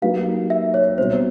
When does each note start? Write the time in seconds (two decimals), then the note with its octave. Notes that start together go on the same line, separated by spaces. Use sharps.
0.02 F#3 A#3 D#4 G4 B4 F5
0.50 E5
0.74 C#5
0.97 B2 G3 C4 C5